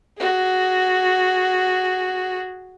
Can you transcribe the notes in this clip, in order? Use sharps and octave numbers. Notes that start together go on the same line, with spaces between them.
F#4 G#4